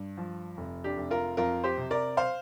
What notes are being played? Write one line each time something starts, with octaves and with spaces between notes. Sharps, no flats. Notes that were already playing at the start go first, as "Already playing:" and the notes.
Already playing: G2
F3
F1
D4 G4
F1
F4 A#4
F2 F4 A#4
G4 C5
C3
A#4 D5
C5 F5